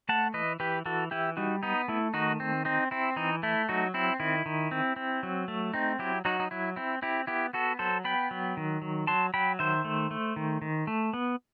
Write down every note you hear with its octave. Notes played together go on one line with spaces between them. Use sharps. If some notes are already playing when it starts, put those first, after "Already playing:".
A3 F#5 A5
E3 B4 D#5
E3 G4 B4
E3 F#4 A4
E3 E4 G4
G3 D#4 F#4
B3 D#4
A3 E4
D#3 D#4 F#4
C4
C4 D#4
C4 E4
E3 D#4
A3 E4
F#3 D#4 F#4
C4 E4
D#3 E4
D#3
C4
C4
F#3
A3
C4 D#4
F#3 E4 G4
F#3 D#4 F#4
D#4
F#3 E4
C4 E4
C4 E4 G4
B3 E4 G4
B3 F#4 A4
F#3 A4 C5
B3 G5 B5
F#3
D#3
F#3
F#3 A5 C6
F#3 G5 B5
D#3 C5 E5
A3
A3
D#3
D#3
A3
B3